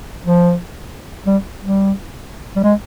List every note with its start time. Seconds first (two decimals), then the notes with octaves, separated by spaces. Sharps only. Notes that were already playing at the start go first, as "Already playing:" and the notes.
0.25 F3
1.27 G3
1.61 G3
2.56 G3
2.63 G#3